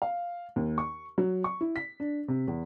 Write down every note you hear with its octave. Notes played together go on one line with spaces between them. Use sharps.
F5
D#2
C#6
F#3
C#6
E4
B6
D4
C3
E2